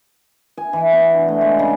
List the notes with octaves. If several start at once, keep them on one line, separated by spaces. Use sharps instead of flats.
G#5
E3
B3
D4
A3
G#3
C#3